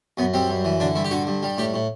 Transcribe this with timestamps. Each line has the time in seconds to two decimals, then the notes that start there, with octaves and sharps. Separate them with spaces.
0.17 F#2 B3
0.34 G3 C4
0.50 F#2
0.65 E3
0.80 D3 D4
0.95 G2 E4
1.05 G4
1.11 D3 F#4
1.27 G2
1.43 G3
1.58 A2 G4
1.74 A2